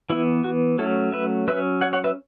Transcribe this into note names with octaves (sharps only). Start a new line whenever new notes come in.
E3 B3 E4
F#4
F#3 A3 C#4 E4 A4
B4 E5
F#3 C#4 B4 E5
C#5 F#5
C#5 F#5
B4 E5